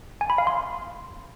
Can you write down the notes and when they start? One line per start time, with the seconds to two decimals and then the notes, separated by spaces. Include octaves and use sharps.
0.21 G#5
0.30 B5
0.38 F5
0.47 C6